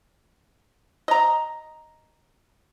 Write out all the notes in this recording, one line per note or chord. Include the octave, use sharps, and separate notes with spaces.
D#5 A#5